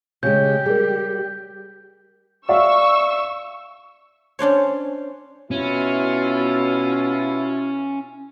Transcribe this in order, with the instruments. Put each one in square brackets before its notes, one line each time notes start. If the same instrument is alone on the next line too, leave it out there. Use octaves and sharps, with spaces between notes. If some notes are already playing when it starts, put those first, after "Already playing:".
[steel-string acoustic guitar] C#3 G#3 [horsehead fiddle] G4 [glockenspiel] G6
[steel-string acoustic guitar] G3 [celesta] G#4 A#4
[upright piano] D5 E5 F5 [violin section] C#6 E6
[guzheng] C#4 D4 C5 C#5
[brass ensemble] B2 E4 F4 [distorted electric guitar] C#4